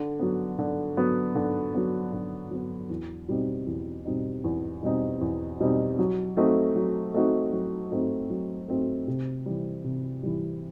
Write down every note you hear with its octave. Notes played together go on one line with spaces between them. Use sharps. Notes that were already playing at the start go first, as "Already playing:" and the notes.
Already playing: D3
F#3 B3
D3
F#3 B3
D3
F#3 B3
D3
F#3 B3
E2
B2 G3 C4 D#4
E2
B2 G3 C4 D#4
E2
B2 G3 C4 D#4
E2
B2 G3 C4 D#4
F#3
A3 C4 D#4 F#4
F#3
A3 C4 D#4 F#4
F#3
A3 C4 D#4 F#4
F#3
A3 C4 D#4 F#4
C3
E3 G3
C3
E3 G3